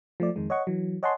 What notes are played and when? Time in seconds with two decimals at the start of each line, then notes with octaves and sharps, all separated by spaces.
0.20 F3 A3 D5
0.36 F2 D#3 G#3
0.50 C#5 D#5 F#5 C#6
0.67 E3 F#3
1.03 C#5 D#5 F#5 G#5 A5 C6